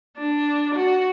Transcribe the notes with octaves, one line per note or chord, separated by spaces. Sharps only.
D4
F#4